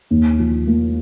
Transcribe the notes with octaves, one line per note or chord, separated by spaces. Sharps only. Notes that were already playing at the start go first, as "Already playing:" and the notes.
D#2
F3
A#3